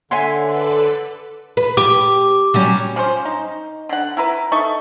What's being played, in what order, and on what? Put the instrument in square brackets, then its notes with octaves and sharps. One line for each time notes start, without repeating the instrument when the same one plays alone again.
[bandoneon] D3 [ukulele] C#5 E5 G#5 [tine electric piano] F#5 C6
[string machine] A4 B4 D5
[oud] B4
[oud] G4 [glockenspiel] D6
[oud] F#3 G3 C#4
[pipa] F3 C#4 C5
D#4
D3 F#5
E4 A#4 B4
D#4 A4 E5 C#6